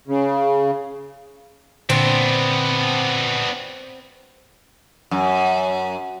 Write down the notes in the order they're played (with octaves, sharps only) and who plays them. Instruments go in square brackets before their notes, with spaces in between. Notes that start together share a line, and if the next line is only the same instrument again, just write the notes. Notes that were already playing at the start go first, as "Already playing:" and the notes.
[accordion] C#3
[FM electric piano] A#2 D3 [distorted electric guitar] B3 D4 [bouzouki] C4
[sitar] F#2